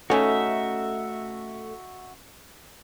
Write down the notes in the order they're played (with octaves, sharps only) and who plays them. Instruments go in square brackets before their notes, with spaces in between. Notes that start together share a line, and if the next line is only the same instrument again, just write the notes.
[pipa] C#3 C#4 D#4 [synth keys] A3 [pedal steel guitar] F#4 E5